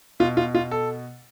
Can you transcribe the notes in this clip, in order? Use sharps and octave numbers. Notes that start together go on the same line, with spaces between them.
B2 F4
F4
F4
A4